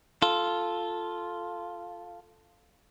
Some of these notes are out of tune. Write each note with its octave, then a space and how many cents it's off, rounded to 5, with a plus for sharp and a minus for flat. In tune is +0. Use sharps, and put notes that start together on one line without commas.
F4 +0 A4 +0